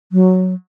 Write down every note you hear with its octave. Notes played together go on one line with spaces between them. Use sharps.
F#3